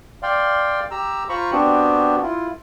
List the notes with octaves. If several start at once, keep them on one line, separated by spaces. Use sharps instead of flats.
D5 F5 G5 C6
G4 A#5 E6
F4 C5 A#5 B5 C#6
B3 C4 D4 F#4 G4
E4 F4